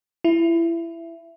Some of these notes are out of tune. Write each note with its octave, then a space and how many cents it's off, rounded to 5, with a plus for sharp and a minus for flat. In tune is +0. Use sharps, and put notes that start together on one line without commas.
E4 +20